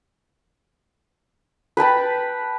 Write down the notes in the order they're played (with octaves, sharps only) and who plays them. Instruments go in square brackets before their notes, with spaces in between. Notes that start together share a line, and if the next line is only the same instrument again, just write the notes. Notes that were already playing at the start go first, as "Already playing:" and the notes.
[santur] B4 G5 A5 B5